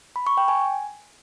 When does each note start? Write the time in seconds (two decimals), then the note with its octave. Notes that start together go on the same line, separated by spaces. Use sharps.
0.16 B5
0.27 C#6
0.37 G5
0.48 G#5